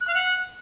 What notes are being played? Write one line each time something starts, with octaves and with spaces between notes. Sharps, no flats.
F#6
F5
F#5